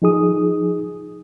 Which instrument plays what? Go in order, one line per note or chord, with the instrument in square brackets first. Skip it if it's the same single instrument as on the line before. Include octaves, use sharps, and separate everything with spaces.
[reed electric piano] F3 D#4 G#4 D#6